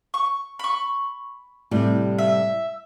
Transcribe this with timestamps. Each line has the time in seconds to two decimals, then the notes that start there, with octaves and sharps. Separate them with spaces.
0.14 C#6
0.59 B5 C#6
1.71 A2 C3 G3
2.18 E5